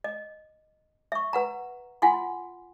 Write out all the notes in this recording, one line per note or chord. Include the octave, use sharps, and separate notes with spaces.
D#5
E5 C#6
B4 F#5 A#5
F4 F#5 G#5 C6